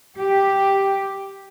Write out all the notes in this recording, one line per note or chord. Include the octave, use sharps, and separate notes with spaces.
G4